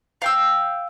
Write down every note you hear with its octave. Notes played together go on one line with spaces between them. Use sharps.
F5 G5 E6